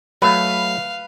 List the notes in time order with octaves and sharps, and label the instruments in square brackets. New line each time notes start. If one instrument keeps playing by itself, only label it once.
[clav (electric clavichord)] F#3 A3 [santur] B4 [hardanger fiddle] F5